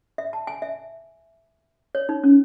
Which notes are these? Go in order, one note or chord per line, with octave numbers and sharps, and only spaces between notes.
E5
A5
G#5
E5
C#5
D#4
C#4